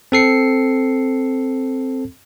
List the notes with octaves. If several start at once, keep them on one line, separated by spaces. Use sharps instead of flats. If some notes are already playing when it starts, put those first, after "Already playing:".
C4 A4 C7 C#7